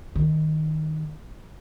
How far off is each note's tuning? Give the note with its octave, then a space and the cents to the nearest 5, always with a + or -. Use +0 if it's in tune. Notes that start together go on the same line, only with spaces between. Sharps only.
D#3 +0